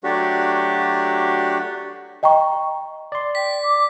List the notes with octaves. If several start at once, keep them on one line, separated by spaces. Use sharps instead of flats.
F#3 A3 D4 F#4 G4
D#5 G5 A#5 C#6
D5 C6
G5 B6
D6